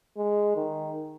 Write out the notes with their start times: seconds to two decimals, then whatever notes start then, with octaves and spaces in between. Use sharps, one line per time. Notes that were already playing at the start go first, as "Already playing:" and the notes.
0.17 G#3
0.56 D#3